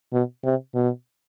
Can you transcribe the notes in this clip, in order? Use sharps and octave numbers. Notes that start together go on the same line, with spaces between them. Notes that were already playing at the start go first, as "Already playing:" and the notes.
B2
C3
B2